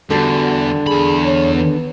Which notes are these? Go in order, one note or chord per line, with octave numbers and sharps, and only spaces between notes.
E2 D3 G3 F#4
E2 G#4 B5
C#5
B3